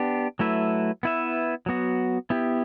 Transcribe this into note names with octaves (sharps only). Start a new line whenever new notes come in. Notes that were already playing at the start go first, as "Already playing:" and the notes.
Already playing: B3 D4 G4
F#3 A3 E4 B4 E5
B3 E4 B4 E5
F#3 B3 F#4
B3 E4 G4